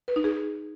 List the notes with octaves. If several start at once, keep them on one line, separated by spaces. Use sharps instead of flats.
B4
D#4
G#4